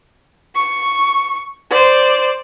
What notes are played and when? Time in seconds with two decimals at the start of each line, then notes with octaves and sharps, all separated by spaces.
0.56 C#6
1.71 C5 D5